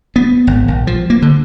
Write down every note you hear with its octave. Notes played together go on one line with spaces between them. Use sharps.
B3
G#1
A#1
F3
A#3
D3